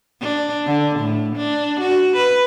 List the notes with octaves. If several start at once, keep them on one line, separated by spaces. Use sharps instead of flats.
D4
D3
A2
D4
F#4
B4